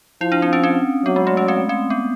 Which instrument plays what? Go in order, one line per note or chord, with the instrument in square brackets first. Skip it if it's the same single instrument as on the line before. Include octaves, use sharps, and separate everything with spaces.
[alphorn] F3 [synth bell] E4
[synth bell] D4
C4
C#4
C4
[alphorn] F#3 [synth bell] B3
[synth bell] G#3
A3
C#4
C4
C4
B3